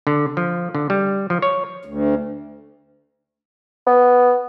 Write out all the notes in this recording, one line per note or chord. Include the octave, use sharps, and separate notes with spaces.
D3
F3
D3
G3
F3
C#5
D2
B3